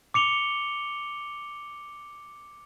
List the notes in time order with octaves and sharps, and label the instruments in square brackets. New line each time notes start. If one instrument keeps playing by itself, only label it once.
[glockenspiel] D6 C#7 F7 G7